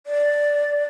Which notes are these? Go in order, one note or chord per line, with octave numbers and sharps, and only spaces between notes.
D5